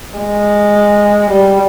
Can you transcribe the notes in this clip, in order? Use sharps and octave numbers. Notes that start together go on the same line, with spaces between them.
G#3
G3